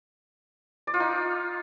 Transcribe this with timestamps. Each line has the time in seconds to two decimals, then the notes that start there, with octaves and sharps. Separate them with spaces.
0.87 D5
0.94 F4
1.00 D#4